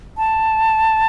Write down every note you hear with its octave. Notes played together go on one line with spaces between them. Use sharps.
A5